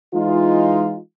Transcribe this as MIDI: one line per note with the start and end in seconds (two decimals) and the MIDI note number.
0.14 0.97 52
0.14 0.97 56
0.14 0.97 63
0.14 0.97 65